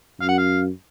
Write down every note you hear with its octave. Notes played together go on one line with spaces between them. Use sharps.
F#2 F5
F#5
F5